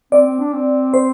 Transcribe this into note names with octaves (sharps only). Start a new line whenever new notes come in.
C4 D5
C4
D4
C4
C5